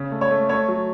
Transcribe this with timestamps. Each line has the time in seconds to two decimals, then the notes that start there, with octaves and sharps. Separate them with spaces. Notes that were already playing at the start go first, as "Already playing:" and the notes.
Already playing: C#3
0.12 A3
0.21 C#5
0.31 A3
0.49 A3 C#5
0.68 F#3